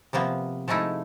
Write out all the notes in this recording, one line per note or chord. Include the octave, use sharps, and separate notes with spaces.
C3 F3 A#3 B3
F3 G#3 A3 D#4 E4